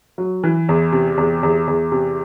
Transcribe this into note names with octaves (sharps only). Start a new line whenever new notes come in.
F#3
E3
E2
C3
E2
E2
E2
C3